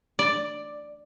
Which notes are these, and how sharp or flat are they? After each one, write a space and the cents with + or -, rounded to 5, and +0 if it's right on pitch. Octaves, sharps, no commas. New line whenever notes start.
D5 +5